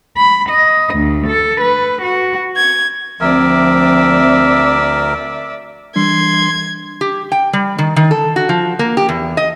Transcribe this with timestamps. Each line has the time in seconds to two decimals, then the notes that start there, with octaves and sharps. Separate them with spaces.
0.17 B5
0.49 D#5
0.94 D2
1.27 A4
1.61 B4
2.02 F#4
2.56 G#6
3.21 D2 F3 C4 A#4 D5 E5
5.96 E3 G3 D4 C6 G#6
7.01 G4
7.32 G5
7.53 G3
7.78 D#3
7.96 D#3
8.11 A4
8.36 F#4
8.49 F3
8.79 A#3
8.97 G4
9.09 E2
9.37 D#5